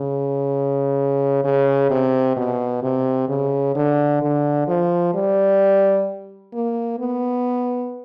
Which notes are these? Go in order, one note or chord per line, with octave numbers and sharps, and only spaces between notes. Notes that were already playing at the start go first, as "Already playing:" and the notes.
Already playing: C#3
C#3
C3
B2
C3
C#3
D3
D3
F3
G3
A#3
B3